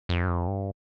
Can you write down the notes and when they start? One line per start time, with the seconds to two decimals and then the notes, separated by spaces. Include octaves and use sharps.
0.09 F2
0.23 F#2
0.28 F2
0.47 G2